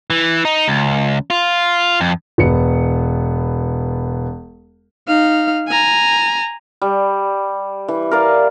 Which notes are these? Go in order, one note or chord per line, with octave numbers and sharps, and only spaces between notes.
E3
D#4
C#2
F4
F2
E1 B3 C#7
D#4 F5
G#5 A#5
G3
E3
A#4 D5 F5